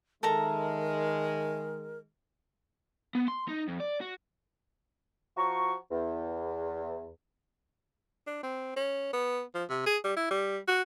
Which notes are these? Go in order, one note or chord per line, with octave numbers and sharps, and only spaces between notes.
D#3 G#3 A4 A#4 E5 A#5
B3
C6
D#4
F2
D5
F#4
F3 F#4 A#5 C#6
E2
D4
C4
C#4
B3
F3
C3
G#4
G3
E4
G3
F#4